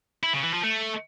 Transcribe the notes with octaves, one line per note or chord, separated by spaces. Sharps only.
E4
C#3
E3
F3
A3